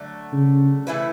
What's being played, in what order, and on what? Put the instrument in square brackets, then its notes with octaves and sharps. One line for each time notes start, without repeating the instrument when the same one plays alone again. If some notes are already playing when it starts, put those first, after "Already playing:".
Already playing: [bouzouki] D3 F#3 A3
[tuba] C#3
[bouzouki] E3 A3 E4 B4